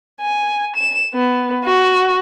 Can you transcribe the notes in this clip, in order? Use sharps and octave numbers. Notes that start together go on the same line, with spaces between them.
G#5
E7
B3
F#4